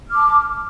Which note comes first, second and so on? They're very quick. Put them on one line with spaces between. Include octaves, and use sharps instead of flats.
F6 D6 A5